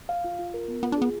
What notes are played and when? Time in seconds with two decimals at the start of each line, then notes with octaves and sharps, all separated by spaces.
0.09 F5
0.24 F4
0.39 F4
0.54 A#4
0.68 B3
0.83 B3 F4
0.92 D4
0.98 B3 G#4